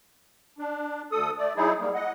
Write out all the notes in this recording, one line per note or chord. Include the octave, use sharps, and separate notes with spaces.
D4
D2 A4 D#6
A3 D5
F#3 D#4 E4 G#4
G3 A#3
D#5 F#5